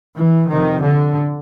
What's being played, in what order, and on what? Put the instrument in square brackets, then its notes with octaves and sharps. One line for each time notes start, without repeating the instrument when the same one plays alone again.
[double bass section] E3
F2 C3 D#3
D3